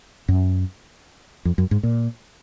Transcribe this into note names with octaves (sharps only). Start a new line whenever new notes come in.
F#2
F2
F#2
G#2
A#2